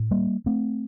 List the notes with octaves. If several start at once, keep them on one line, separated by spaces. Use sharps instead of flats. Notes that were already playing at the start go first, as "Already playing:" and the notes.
Already playing: A2
G3 A#3
A3 C4